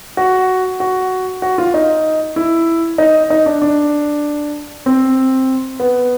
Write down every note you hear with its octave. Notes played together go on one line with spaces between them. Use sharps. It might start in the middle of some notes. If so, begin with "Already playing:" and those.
F#4
F#4
F#4
F4
D#4
E4
D#4
D#4
D4
D4
C4
B3